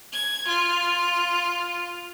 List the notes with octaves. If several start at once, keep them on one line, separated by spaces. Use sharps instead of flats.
G#6
F4